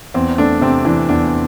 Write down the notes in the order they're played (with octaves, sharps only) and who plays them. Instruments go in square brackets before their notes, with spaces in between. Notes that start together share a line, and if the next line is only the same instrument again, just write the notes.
[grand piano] E2 [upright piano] C4
[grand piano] A3 [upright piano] D4
[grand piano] C3 [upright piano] C4
[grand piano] E3 [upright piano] D4
[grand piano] E2 [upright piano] D4